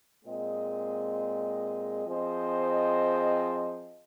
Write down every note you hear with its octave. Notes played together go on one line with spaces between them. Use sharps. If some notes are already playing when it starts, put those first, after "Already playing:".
A#2 G#3 C4 G#4 D#5
F3 C4 G#4 C5 D#5